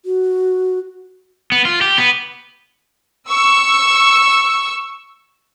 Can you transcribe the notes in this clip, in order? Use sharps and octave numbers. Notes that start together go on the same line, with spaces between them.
F#4
B3
F4
G4
B3
C#6 E6